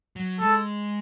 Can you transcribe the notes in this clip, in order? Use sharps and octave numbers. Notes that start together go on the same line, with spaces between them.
F#3
G#3 A4